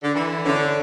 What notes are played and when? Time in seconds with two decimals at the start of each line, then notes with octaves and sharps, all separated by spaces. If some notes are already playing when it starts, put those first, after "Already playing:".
0.03 D3
0.14 E3 A4
0.45 D3 C#4